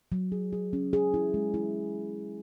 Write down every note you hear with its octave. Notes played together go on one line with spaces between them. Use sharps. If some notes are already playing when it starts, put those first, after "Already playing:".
F#3
G#4
G#4
C#4
G#4
E4
G#3
E4